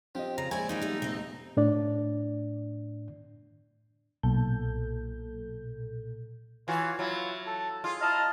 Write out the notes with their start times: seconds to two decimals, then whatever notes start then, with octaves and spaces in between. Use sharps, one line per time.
0.15 F3 C4 G4 D#5
0.38 C#3 A#5
0.51 A#1 G#3 E4 C#5 D5 G#5
0.69 F3 C#4 D#4 G5
0.81 G3 A3 B3
1.02 F1 C4 D#5
1.57 A2 D4 D5
4.23 B1 A#2 A4 G6
6.68 E3 F4 F#4 C#5 F5
6.99 F#3 E4 F4 F5
7.47 A4 A5
7.84 F4 G#4
8.01 E4 D#5 A5 A#5 F6